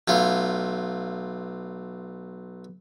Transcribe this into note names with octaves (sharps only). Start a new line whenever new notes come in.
B1 A3 F4